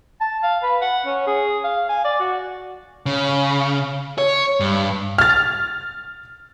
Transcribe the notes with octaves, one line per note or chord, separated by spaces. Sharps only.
A5
F5
B4
F#5
C#4
G#4
F5
G#5
D5
F#4
C#3
C#5
G2
F6 A6